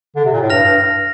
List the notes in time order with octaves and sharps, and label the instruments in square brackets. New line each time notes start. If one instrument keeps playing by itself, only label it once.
[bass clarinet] D3
C3
A#2
A2
[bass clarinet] G2 [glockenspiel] F6 A#6 F7
[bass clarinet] G2